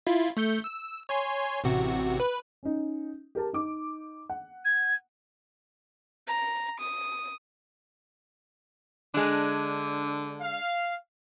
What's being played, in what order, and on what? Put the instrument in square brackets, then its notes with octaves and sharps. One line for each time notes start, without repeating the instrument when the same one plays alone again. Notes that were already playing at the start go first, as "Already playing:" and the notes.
[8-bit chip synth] E4 F4
A3 G6 C#7
E6
C#5 G#5 C6
A1 C3 F#4
B4
[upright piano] C#4 D#4
G4 A#4 A5
D#4 D6
F#5
[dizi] G#6
[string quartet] A#5
D#6
[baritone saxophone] D3 [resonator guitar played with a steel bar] G#3 D4
[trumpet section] F5